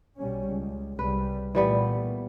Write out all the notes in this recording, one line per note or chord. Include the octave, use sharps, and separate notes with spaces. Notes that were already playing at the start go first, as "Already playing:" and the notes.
B1 G3 C#4
C#2
C2 C#3 G3 B4
A#2 E3 G3 A3 B3